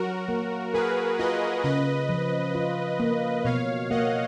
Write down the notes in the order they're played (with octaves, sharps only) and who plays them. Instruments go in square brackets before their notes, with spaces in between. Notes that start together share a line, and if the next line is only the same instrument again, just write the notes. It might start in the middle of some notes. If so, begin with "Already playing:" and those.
Already playing: [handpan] F#3 [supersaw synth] F#4 A#4
[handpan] A#3
[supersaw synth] G#4 B4 [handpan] A#4
[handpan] F4 [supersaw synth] B4 D#5
[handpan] C#3 [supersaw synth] B4 D#5
[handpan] F3
F4
A#3
[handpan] B2 [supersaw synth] C#5 F5
[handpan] A#3 [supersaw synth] D#5 F#5